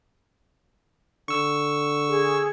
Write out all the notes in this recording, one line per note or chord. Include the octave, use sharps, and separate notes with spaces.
D3 C#6 E6
G#4